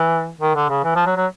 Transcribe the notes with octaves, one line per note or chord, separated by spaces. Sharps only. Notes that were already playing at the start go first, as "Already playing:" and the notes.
Already playing: E3
D#3
D3
C#3
E3
F3
F#3
F#3